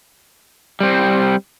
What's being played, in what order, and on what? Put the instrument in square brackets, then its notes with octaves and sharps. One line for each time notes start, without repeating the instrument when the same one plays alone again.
[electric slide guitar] G3 C4